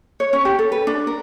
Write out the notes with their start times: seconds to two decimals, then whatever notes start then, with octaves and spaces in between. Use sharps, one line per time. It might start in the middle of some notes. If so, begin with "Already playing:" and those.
0.20 C#5
0.33 C#4
0.45 G4
0.59 A4
0.72 B4
0.87 D4
1.07 A#4